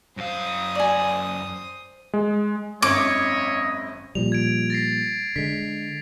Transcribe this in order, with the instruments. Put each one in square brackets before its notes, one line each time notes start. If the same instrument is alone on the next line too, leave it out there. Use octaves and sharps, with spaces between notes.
[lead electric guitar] F#2 F5 [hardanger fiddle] C5 D#6
[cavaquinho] D5 G#5
[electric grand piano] G#3
[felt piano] G#1 F#2 [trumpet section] E4 D#5 [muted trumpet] C#5 [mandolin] D6
[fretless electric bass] A#2 F3 G3 [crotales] F7
[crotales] G#6 D7
A6 A#6 C7
[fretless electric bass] D3 G#3 [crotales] B6